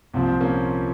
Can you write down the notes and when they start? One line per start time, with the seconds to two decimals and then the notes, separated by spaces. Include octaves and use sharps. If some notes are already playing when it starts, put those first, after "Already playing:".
0.14 C2 A#2 F3 C4
0.41 A#3 C#4